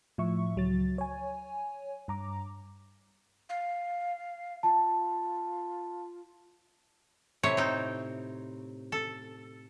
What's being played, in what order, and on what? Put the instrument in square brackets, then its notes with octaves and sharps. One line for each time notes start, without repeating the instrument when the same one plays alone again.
[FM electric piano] A2 F3 E5 C#6
C#2 F#3 A6
C#5 G#5
G2 A#5 D6
[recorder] F5
[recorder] F4 [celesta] A5
[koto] A2 C3 C#5
C4 D#4
A4